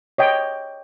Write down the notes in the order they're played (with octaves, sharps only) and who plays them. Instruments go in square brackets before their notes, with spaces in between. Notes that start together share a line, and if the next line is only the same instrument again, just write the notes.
[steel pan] C#5 D#5 G5